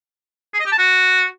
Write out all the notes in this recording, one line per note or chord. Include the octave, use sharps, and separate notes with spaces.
G#4
D#5
G4
A5
F#4